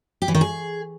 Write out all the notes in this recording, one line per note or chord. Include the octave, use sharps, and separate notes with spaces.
G4
E3
D#3
G#4